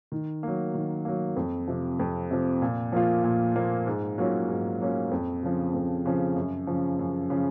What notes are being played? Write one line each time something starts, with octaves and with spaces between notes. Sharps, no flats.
D#3
F#3 A#3
D#3
F#3 A#3
F2
C3 F3
F2
C3 F3
A#2
F3 A#3 F4
A#2
F3 A#3 F4
G#2
F#3 A#3 C#4 F4
G#2
F#3 A#3 C#4 F4
F2
C#3 F3
F2
C#3 F3
F#2
C#3 F3
F#2
C#3 F3